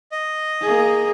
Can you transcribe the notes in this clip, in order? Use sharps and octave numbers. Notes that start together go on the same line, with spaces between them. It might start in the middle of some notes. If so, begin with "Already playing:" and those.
D#5
A#3 G#4